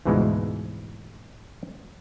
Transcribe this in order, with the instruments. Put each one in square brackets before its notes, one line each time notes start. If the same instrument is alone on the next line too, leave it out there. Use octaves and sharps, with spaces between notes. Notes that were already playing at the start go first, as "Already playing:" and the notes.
[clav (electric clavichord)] D2 G#2 B2 E3 F3 G#3